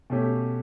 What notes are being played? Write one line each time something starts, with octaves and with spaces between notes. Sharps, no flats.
B2 A3 C#4 G4